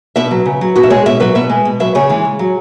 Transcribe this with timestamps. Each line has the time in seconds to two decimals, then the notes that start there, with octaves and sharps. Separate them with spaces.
0.16 B2 B4 E5
0.31 F#3
0.46 C#3
0.61 F#3
0.76 B2 F#4 B4
0.83 E5
0.90 G#3 G#4 C#5
1.06 B2 B4 E5
1.20 F#3 B4 E5
1.35 B2 B4 E5
1.50 G#3
1.65 B2
1.80 F#3 B4 E5
1.95 C#3 G#4 C#5
2.09 E3 G#3
2.25 C#3
2.39 F#3